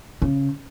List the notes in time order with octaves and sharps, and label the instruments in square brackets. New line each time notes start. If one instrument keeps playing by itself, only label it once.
[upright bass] C#3